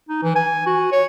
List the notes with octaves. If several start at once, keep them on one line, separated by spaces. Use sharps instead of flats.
D#4
E3
G#5
F#4
C#5